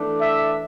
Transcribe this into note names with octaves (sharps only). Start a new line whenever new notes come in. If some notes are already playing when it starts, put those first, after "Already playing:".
Already playing: E3 A3 D4
E5